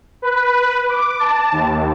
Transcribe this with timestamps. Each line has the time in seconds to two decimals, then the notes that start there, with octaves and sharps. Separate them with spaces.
0.22 B4
0.88 D6
1.19 A5
1.52 D#2